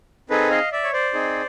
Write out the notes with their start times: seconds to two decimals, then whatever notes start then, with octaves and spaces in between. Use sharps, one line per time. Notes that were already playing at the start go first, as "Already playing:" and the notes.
0.30 C4 D#4 G#4 A4 B4
0.50 D#5 F5
0.72 D5 E5
0.83 C#5
0.93 C5 D5
1.13 C4 D#4 G#4